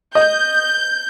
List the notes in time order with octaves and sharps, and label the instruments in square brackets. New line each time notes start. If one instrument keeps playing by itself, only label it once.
[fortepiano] D#5 [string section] G6